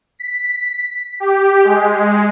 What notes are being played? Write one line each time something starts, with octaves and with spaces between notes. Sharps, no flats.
B6
G4
G#3